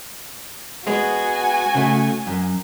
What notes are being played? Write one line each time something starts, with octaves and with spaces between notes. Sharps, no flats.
G#3 B3 F#4 G#5
C#3 A3
F#2